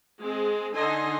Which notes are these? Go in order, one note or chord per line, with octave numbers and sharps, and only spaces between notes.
G#3 C4 G#4
D3 D#4 A4 D#5 G#5 C6